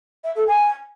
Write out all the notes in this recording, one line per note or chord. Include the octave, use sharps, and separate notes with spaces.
E5
A4
G#5